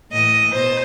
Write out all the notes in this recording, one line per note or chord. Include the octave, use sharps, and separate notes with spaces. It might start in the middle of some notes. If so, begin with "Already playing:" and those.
A2 E3 D#5
B2 C5